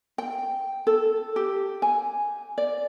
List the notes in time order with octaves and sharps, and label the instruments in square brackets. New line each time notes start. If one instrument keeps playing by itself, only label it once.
[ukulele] G5
A4
G4
G#5
D5